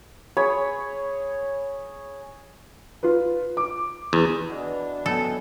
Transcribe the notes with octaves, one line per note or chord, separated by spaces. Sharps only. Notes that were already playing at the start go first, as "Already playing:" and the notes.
G#4 C#5 B5
F4 B4
D6
E2
B2 E3 D4
F#3 B3 C#4 E4 A4 D#5